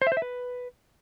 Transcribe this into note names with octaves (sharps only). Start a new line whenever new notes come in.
C5
E5
C5
E5
B4